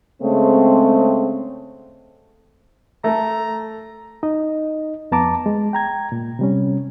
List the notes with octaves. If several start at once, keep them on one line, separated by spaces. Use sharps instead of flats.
C#3 G#3 A3 C4
A3 A4 A#5
D#4 D#5
F2 B3 A5 A#5 D6
G#3
G5 A#5 G#6
A#2
C3 G3 C#4